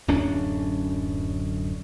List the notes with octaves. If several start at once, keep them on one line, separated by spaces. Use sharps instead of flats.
D1 F#2 C#4 D4